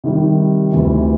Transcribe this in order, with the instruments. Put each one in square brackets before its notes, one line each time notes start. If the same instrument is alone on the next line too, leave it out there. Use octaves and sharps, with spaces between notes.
[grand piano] C3 D#3 G3
D2 C3 E3